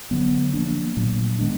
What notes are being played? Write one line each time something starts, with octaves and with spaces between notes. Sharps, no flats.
D3 F#3 B3
F3 A#3 D4
A#2 F#3 A3
D#3 G#3 B3 D4